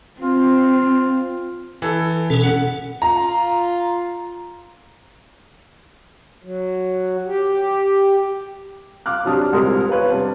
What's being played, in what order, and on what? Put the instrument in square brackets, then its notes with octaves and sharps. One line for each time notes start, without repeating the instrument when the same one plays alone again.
[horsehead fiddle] C4 [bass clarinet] F4
[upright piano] E3 A4
[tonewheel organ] B2 C#4 A4
[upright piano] F#5
[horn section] F4 [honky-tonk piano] A#5
[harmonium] F#3
G4
[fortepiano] F4 D6 F6 F#6
C3 F#3 D4 D#6 F6
C2 A#2 G#3 A#4 D#6
B3 F4 B4 C#5
G2 C3